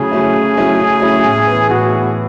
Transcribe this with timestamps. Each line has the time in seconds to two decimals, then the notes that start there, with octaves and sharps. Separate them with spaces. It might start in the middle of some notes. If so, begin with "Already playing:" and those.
Already playing: C#3 F#3 A3 C#4 E4 G#4
0.11 F#3 A3 C#4 E4
0.33 C#3
0.57 F#3 A3 C#4 E4
0.79 C#3
1.02 F#3 A3 C#4 E4
1.24 A2
1.47 E3 B3
1.70 A2 F#4
1.92 E3 B3